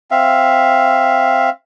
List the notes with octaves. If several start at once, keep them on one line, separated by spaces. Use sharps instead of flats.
C4 E5 F5